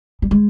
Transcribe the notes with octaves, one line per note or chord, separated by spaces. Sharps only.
G3
G#3